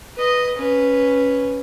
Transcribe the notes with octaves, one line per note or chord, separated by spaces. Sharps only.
B4 D#5
C#4 B4